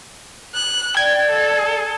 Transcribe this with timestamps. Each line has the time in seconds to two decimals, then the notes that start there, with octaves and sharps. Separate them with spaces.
0.55 F#6
0.97 D5 G5 G#6
1.30 A4